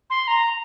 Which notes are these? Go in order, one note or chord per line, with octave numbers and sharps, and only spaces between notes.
C6
A#5